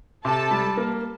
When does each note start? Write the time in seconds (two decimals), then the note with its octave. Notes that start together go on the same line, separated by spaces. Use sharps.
0.25 C3 A4 A5
0.51 G3
0.77 A#3